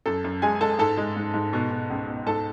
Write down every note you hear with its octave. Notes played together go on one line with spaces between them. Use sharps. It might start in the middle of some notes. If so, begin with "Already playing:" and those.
F#2 A4 A5
F#2
G#3 G#4 G#5
G#3 A4 A5
G#2 A4 A5
G#3
G#2
G#2
B2
B2
C#2
B2
G#2 A4 A5